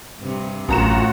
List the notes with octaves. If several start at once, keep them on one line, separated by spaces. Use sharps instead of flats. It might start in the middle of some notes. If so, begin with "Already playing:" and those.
G2 C3
A1 F#2 A2 F4 F#4 F#5 A#5 E7